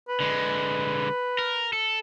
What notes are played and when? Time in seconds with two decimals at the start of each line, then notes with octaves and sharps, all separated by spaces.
0.09 B4
0.20 D3 G#3
1.39 A#4
1.73 A4